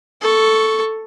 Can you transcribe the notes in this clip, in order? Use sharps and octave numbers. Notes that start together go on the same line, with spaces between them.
A4 C#6